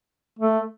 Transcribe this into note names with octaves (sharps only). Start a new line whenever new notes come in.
A3